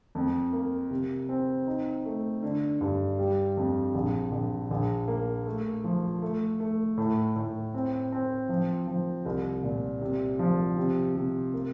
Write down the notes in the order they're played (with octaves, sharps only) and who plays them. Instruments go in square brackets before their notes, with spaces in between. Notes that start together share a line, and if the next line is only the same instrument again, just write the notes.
[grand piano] F2
A#3
C3
C4
D#4
A3
D3
G2
G3
F2
A#1
A#1
A#1
A#3
A3
F3
A3
A3
A2
A2
C4
C4
F3
F3
C2
A#2
C3
F3
C3
C3
A#3